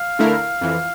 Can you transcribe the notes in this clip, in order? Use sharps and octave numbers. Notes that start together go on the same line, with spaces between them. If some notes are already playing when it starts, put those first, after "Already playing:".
Already playing: F5
D3 A3 E4 A#4
F2 E3